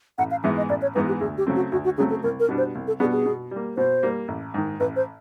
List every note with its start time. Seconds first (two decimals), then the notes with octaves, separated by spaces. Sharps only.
0.18 A1 F#5
0.31 F5
0.44 G#2 E3 G#3 B3 E5
0.57 D#5
0.69 A1 D5
0.82 C#5
0.95 G#2 E3 G#3 B3 B4
1.08 G4
1.20 D2 G#4
1.38 G4
1.47 C#3 F#3 A3 C4
1.55 F#4
1.72 D2 F#4
1.84 F#4
1.98 C#3 F#3 A3 C4 G#4
2.10 A4
2.23 C2 A#4
2.40 A#4
2.48 B2 G3 B3 D4
2.58 C5
2.75 C2
2.87 A4
3.00 B2 G3 B3 D4 G#4
3.12 G#4
3.25 B2
3.51 G3 A#3
3.77 B2 C5
4.03 G3 A#3
4.28 A1
4.54 G#2 D#3
4.80 A1 B4
4.96 C5